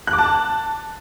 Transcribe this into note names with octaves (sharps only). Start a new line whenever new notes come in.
F#6
D6
A5